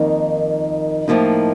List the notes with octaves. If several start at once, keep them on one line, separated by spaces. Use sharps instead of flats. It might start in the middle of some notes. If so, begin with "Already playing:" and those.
Already playing: F2 D#3 A#3 D#4
A2 F3 A#3 D#4